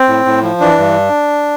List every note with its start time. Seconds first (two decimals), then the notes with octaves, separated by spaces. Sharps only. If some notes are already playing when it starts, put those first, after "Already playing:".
Already playing: C4
0.08 A2
0.25 A2
0.43 F3
0.60 E3 D4
0.78 G2